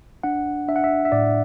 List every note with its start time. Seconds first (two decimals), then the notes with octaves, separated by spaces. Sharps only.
0.23 D4 F#5
0.68 D4 E5
0.76 F#5
0.84 E5
1.05 E5
1.12 A2 D5